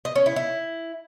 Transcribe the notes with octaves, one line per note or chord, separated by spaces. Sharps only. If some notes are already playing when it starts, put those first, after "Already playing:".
D#5
C#4
E4
E4